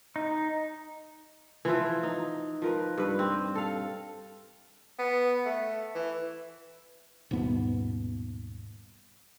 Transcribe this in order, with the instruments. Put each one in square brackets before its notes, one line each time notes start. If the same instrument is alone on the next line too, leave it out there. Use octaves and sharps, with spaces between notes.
[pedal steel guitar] D#4
[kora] E3 F3 F4 E5
D#4
F3 A#4 B4
G2 B4
C4
A4 F5
[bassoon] B3
A3
E3
[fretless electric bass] D#1 G#2 B2 B3